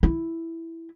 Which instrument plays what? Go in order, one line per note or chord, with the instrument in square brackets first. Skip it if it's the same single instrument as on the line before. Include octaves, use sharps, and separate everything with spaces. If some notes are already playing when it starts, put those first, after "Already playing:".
[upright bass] E4